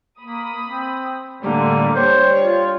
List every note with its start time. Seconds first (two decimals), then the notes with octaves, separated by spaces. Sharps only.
0.20 A#3 B5 D#6
0.64 C4
1.43 A2 D3 G3 A#3
1.95 G3 D4 C5 C#5
2.40 F4